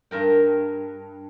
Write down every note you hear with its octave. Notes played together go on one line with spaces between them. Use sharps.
G2 A#4 G5